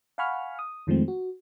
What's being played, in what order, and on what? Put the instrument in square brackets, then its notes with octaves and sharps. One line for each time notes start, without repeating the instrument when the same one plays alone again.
[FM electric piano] F5 F#5 G#5 B5 C#6 F6
D#6
F2 D#3 F3 G#3 A3 C4
F#4